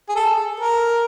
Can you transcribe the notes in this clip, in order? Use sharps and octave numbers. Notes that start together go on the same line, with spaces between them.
G#4
A4
A#4